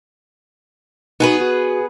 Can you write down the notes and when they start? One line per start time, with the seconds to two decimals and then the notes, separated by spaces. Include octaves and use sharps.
1.20 B3 D#4 F#4 G#4 B4
1.41 F#4